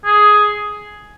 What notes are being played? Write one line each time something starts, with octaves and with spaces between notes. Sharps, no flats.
G#4